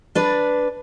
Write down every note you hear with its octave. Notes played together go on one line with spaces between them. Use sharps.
D4 B4 D5